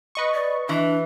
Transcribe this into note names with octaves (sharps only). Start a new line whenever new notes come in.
B4 D#5 C#6
D5
E3 D4